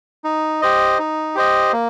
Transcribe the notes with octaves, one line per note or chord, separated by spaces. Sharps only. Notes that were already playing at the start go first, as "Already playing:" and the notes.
D#4
G4 C5 D#5
D#4
G4 C5 D#5
A#3